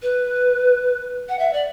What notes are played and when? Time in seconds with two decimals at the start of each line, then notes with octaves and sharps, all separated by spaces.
0.02 B4
1.29 F#5
1.39 E5
1.53 D5